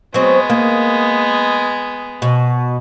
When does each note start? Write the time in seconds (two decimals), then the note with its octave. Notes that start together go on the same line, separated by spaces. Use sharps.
0.14 F#3 G#3 B3 C4
0.50 A#3
2.22 B2